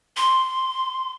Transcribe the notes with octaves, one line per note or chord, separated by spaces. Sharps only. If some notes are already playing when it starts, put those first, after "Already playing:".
C6